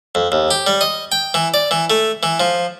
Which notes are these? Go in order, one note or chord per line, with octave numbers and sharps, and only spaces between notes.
F2
D#2
G4
G3
D#5
G5
E3
D5
E3
A3
E3
F3